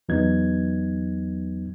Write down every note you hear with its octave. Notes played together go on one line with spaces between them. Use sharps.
E2 F#3 B3 D#4 G#6